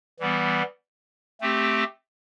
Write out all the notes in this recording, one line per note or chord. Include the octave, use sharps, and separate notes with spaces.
E3 G3 B3
A3 C4 G4